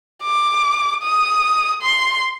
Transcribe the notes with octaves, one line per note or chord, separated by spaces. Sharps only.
D6
D#6
C6